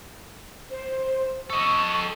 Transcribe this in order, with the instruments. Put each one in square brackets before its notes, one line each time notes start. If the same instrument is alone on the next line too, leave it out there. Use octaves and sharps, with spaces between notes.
[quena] C5
[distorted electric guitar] A4 D#5 [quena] C#6